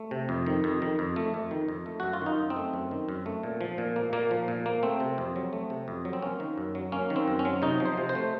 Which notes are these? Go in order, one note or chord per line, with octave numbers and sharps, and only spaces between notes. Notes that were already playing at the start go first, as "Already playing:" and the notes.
Already playing: A3
C3
F2
D#3
F2
D#3
F2
A3
F2
D#3
F2
A3
F#2 F#4
F4
D#3 D#4
F#2
C4
A3
F#2
D#3
F#2
A3
A#2
F3
A#2
A#3
A#2 A#3
F3
A#2
A#3
A3 C4
C3
F2
F#3
A3
C3
F2
F#3
C4
A#3 C#4
D#3
F#2
F#3
A#3 C#4
D#3
C4
F#2
C#4
F#3
C3 D#4
F3
C5
C3
C5
A3